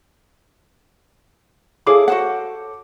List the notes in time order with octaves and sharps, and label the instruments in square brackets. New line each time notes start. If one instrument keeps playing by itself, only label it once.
[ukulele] E4 G#4 F5 [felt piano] A4 C#5 D6
[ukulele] F#4 C5 F#5